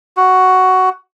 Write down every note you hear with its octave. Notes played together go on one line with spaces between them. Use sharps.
F#4